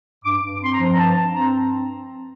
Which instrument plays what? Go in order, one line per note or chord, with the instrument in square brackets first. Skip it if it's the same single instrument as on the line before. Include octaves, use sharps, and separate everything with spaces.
[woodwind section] G2 D6
G2
C4 C6
A#5
F3
A#5
G2 A5
G2
C4 A#5